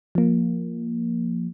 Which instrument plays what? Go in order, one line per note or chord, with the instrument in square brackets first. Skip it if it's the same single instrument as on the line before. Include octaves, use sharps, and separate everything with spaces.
[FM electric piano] F3 A#3